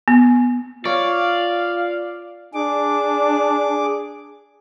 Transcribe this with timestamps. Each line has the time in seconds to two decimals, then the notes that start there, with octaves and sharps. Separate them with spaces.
0.08 B3
0.85 F4 C#5 D5 F5
2.54 D4 G#4 D6